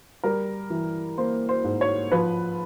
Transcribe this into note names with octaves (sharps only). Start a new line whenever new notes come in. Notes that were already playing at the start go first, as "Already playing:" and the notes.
G3 A#4
E3
A#3 C5
C5
G#2
C#5
F3 B4